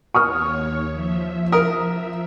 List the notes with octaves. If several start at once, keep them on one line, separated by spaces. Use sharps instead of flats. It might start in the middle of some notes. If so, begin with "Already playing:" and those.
D#2 C#5 C#6 D#6 F6
F3 E5
A#4 D#6